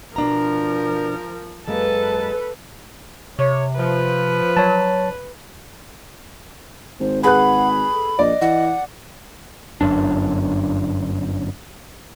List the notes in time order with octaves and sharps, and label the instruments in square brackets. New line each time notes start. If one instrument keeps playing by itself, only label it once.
[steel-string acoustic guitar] B2 D4 A#5 [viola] F3 [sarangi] A#4
[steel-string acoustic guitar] F#2 G#3 A#3 [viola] A4 B4 [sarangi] A5
[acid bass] C3 [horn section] C#5
[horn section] F3 [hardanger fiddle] B4
[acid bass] F#3 [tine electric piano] C#5 A5
[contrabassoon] G#1 [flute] C5
[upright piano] G#4 B4 F#6 [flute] F#5 [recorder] B5
[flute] A4
[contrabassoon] A#1 [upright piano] D5 [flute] D#5
[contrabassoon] E3 [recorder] F#5
[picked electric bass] G1 F#2 D4